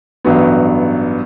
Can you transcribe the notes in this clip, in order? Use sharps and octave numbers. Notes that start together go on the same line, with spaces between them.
A1 G2 F#3 B3